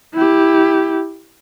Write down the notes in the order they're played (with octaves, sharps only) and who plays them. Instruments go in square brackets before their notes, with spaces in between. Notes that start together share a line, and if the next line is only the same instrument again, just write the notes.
[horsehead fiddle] E4 G4